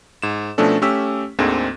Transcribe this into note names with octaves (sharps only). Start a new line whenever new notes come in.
G#2 E7
B2 F3 A3 C#4 D4 A4
A3 C#4 G4 E6 B6
D2 G#2 D3 G#3 A#3 C4